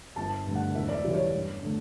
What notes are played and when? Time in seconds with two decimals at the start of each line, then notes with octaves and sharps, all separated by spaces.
0.16 G1 A5
0.46 G2 D3 A3
0.55 F#5
0.75 E1 E5
0.89 D5
0.94 E5
1.04 E2 C#3 G3
1.14 C#5
1.34 G2
1.62 D3 A3